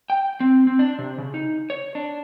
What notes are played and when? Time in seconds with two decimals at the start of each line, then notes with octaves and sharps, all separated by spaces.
0.10 G5
0.40 C4
0.67 C4
0.79 D4
0.99 C3
1.18 C#3
1.34 D#4
1.70 C#5
1.95 D4